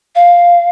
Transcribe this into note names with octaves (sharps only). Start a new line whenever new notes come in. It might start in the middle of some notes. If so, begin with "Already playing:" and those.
F5